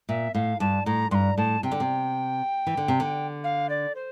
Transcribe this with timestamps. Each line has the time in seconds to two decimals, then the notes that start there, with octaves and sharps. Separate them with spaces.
0.09 A#2 E5
0.35 A2 F5
0.60 G2 A5
0.86 A2 A#5
1.11 G2 C6
1.15 A#5
1.38 A2 A5
1.63 C3 G5
1.71 D3
1.80 C3
2.67 E3
2.77 D3
2.88 C3
3.00 D3
3.44 F5
3.69 D5
3.95 C5